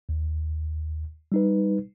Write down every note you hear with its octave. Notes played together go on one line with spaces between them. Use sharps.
D#2
G3 D#4 B4